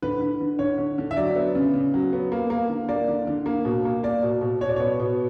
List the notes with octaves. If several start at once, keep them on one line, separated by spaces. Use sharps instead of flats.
D3 B4
D3
D3
D3 C#5
D3
D3
E5
F#3 D5
B3
C#3
C#3
F#3
B3
A#3
A#3
D3
A#3 D5
D3
D3
A#3
B2
A#3
A#3 D5
B2
B2
B2 C#5
D5
B3 C#5
B2